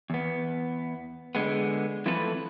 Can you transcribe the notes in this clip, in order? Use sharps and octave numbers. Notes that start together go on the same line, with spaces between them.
E2 B3
D3 G#3 B3
E3 F3 A3 C4 A4 B4